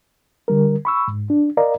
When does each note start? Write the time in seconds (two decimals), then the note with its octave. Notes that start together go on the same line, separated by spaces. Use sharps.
0.48 D3 G3 A#4
0.85 B5 C#6 E6
1.08 G#2
1.30 D4
1.57 A#4 D5 D#5 F5 A#5